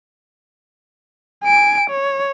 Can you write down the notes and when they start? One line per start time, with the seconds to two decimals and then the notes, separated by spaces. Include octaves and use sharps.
1.43 G#5 D7
1.90 C#5